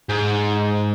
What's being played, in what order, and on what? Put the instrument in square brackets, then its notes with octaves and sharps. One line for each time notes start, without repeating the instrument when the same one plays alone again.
[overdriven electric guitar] G#2